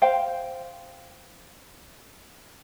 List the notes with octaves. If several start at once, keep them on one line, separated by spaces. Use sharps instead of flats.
C5 F5 G5